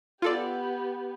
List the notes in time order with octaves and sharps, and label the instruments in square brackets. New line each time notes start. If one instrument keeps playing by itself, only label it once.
[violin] B3 G4 [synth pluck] F4 A4 D5